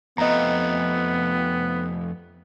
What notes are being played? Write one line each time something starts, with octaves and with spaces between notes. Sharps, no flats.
F2 A3 B3 D#5 A#5